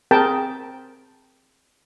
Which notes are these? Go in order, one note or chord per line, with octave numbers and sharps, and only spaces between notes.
C4 G#4 A#4 G5 A5